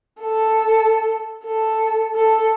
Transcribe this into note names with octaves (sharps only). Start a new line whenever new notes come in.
A4
A4
A4